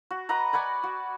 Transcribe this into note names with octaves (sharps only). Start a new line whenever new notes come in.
F#4
B4 D#5 F#5 A#5
D5 F#5 G#5 B5
F#4